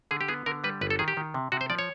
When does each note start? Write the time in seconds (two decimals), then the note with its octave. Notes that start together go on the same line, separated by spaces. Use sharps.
0.11 D3 G#4
0.21 G4
0.28 B3 G#4
0.46 D3 A#4
0.64 G3 B4
0.81 G1 B4
0.90 A4
0.99 D#3 G#4
1.08 G4
1.17 D#3
1.34 C3
1.52 C3 F#4
1.61 C5
1.70 F3 D5
1.79 C#5